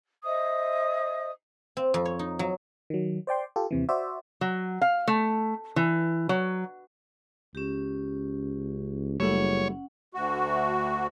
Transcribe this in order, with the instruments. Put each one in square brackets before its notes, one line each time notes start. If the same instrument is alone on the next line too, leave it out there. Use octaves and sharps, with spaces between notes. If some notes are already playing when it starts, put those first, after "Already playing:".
[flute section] C5 D#5 E5 D#6
[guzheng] C4
F2
C#5
D#4
F#3
[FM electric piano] D#3 F#3
C5 D5 G5 C6
F4 G4 A4
D#2 C3 E3
F#4 C5 D5 E5
[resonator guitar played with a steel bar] F#3
F5
A3
E3
F#3
[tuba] C#2 [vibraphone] C#4 G4
[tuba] F#1 [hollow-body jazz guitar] G3 A3 [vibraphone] C#4 F#5 [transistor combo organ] C#5
[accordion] D2 F#4